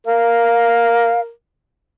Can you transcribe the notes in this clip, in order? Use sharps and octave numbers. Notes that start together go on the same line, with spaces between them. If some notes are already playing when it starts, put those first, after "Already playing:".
A#4 F5